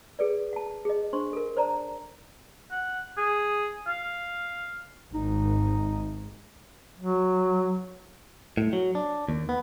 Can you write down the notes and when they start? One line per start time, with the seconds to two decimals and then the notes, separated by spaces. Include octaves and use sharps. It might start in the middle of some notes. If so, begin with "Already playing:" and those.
0.19 G#4 A4 B4 D5
0.53 F#5 A5
0.85 G#4 D#5
1.13 D4 C5 C6 C#6
1.33 A4 A#4
1.57 C5 D5 A5 A#5
2.71 F#5
3.17 G#4
3.87 F5
5.14 G#1 D#4
6.98 F#3
8.57 A2
8.73 F#3
8.95 D4
9.29 D#2
9.49 B3